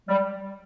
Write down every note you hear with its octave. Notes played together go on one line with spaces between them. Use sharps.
G3